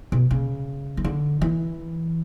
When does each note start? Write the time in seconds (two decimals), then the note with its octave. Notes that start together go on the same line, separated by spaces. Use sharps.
0.12 B2
0.31 C#3
0.97 E3
1.05 D3
1.42 E3